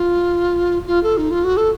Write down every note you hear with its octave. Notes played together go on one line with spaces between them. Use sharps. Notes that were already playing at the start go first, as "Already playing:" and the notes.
Already playing: F4
F4
A4
D#4
F4
F#4
A4